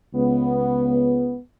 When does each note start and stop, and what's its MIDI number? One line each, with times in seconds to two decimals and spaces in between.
0.14 1.37 37
0.14 1.37 59